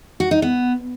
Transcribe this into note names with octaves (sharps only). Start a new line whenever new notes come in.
F#4
D#4
B3